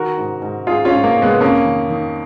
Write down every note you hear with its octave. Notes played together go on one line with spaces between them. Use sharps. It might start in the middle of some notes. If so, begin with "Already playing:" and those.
Already playing: D#3 F#4 A#4
G#2
G#2
G#2 F4 G#4
C#4 F4
G#2
A#3
G#2
G#3 B3
F2 A#3 C#4
D#3
D#3